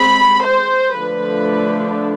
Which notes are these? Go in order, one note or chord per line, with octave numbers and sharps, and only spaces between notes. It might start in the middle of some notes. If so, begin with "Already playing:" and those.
Already playing: G#3 C4 B5
C5
D3 F3 A3 D4 B4